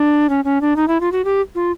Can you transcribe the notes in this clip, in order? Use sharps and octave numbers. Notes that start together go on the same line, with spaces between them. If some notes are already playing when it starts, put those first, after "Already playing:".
Already playing: D4
C#4
C#4
D4
D#4
E4
F4
F#4
G4
F4